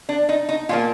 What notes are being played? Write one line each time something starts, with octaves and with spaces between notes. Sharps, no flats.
D4
D#4
D#4
A#2 F3 A#3 F4